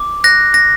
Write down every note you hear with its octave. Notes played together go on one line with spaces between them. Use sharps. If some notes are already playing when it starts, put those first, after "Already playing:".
Already playing: D6
F#6 A#6
A#6